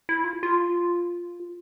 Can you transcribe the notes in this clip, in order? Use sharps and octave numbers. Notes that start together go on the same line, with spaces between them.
E4
F4
F4